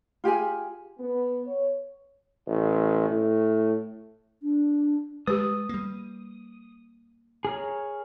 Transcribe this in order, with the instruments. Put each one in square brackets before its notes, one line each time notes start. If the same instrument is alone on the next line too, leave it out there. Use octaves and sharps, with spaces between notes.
[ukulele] F4 G4 G#4 G#5
[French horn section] B3
C#5
[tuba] A1
A2
[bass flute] D4
[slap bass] G#3 [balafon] G4 B4 [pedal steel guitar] D#6
[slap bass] G3 A#3
[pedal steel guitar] G#4 A#4 C#5